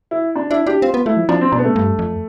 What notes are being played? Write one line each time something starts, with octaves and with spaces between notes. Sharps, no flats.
E4
D4
D4 E4
D4 G4
C4 F4
B3
A3 E4
F3
F3 D4
C4
B2 D4
B3
A3
G2
F2